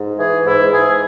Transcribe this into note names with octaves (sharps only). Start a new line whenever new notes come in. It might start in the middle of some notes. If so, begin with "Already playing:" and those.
Already playing: G#2
E3 G#4
G#2 E4
G#2 G#4